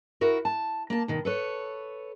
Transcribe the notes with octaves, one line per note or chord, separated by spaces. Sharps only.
E4 F#4 A#4
A5
A#3 A5
B2 D#3
A4 B4 C#5